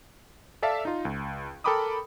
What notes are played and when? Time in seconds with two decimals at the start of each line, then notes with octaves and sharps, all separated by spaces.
0.62 A4 D5 E5 F5 A5
0.85 D#4 F4
1.05 C#2
1.64 A4 A#4 G5 B5 D6 D#6